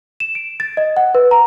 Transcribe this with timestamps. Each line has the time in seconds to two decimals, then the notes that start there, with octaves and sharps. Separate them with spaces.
0.20 E7
0.35 D7
0.60 A6
0.77 D#5
0.97 F#5
1.15 B4
1.31 A#5